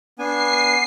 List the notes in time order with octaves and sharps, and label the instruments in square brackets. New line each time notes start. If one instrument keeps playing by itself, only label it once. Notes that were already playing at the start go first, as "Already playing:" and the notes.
[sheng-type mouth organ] B3 D4 G#5 [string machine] C7